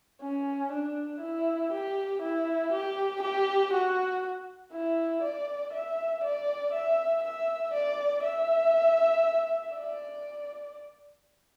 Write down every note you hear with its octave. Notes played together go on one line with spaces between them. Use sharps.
C#4
D4
E4
G4
E4
G4
G4
F#4
E4
D5
E5
D5
E5
E5
D5
E5
D5